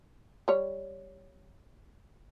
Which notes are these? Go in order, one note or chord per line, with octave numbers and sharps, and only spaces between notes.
G3 C#5